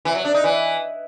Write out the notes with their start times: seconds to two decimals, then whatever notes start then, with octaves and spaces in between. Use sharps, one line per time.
0.05 E3
0.15 F#3
0.25 D4
0.34 D#4
0.44 E3